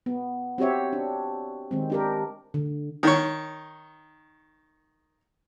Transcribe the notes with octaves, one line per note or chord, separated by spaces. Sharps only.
B3
C4 F#4 G4 C#5 E5
D4
D#3 G#3 C4
D4 G4 A#4
D3
D#3 C#5